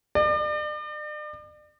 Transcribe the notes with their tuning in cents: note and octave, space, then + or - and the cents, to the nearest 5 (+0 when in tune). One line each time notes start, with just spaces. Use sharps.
D5 +40